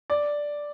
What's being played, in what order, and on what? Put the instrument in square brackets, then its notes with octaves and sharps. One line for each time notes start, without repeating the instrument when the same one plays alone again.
[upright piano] D5